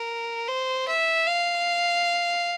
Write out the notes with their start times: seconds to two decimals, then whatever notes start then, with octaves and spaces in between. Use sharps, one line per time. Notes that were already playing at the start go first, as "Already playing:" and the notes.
Already playing: A#4
0.48 C5
0.88 E5
1.27 F5